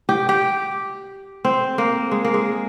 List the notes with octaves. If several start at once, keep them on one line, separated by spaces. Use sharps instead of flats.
G4
G4
C4
A#3
G#3
A#3
G#3